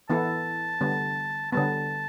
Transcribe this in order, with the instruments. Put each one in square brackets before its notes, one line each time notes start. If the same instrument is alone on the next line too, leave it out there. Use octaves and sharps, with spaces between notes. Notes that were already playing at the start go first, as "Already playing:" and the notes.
[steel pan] E3 B3 E4 A4 [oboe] A5
[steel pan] D3 G3 B3
[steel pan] D3 G3 B3 [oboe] A5